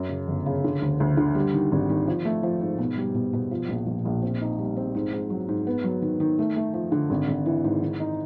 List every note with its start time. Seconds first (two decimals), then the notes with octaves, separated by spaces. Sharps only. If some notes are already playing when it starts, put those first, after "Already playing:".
Already playing: F#2
0.09 C#3
0.28 G1
0.46 C#3
0.64 D3
0.82 D2
1.00 D2
1.17 D3
1.35 G3
1.54 D#3
1.72 G#1
1.89 D#3
2.07 F3
2.25 A3
2.43 F3
2.61 G#2
2.79 B2
2.97 G3
3.15 B2
3.33 B2
3.51 F3
3.68 A#1
3.86 A#1
4.05 A#1
4.22 C4
4.41 D#4
4.59 G3
4.77 C4
4.95 G#2
5.12 G#2
5.30 F#3
5.48 G#2
5.67 B3
5.84 F#3
6.02 D#3
6.20 D#3
6.39 A3
6.56 A3
6.74 F3
6.92 D3
7.10 G#1
7.28 G#1
7.46 E3
7.64 G#2
7.82 D#3
8.00 D#4